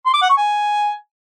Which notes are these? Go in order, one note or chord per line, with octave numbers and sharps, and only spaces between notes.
C6
D6
F#5
C#6
G#5